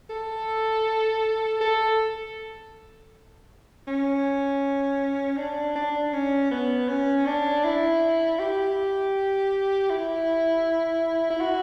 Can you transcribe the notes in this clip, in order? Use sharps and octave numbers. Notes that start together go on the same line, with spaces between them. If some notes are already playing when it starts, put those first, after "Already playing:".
A4
A4
C#4
D4
D4
C#4
B3
C#4
D4
E4
G4
E4
E4
F#4